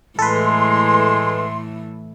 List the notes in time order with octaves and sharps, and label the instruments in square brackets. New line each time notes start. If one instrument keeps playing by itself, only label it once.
[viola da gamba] A2 E3 A3 [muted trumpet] G#3 [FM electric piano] A4 B4 [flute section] C6